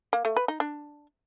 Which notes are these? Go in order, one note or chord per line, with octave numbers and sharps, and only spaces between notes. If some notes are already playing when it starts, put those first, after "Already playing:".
A#3
A3
B4
D#4
D4